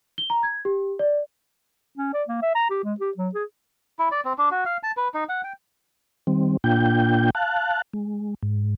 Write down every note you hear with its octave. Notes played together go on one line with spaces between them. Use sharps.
G7
A#5
G#6
G4
D5
C#4
D5
A#3
E5
A#5
G4
G#3
G4
F#3
G#4
E4
D5
C4
D4
F#4
F5
A5
B4
D#4
F#5
G5
D#3 G3 C4
A#2 A#3 D4 F4 G5 G6
F5 A5 F#6
G#3
G#2